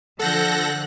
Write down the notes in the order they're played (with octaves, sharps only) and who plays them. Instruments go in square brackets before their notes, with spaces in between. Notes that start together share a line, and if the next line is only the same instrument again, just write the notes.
[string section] D3 F3 F#6 [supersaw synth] A4 A#6 [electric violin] F#5 G6